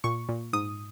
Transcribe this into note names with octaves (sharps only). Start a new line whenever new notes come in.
A#2 C#6
A#2
G#2 D#6